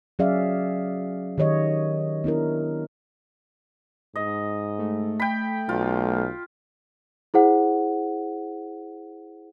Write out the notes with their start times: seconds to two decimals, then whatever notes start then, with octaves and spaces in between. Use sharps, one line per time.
0.19 F#3 C#4 G#4 D5 E5 F5
1.38 D#3 G4 C#5 D#5
2.24 B3 D4 E4 A#4
4.16 G#2 D#5
4.79 A3
5.20 G5 B5
5.69 B1 F4
7.34 E4 G#4 C5 F#5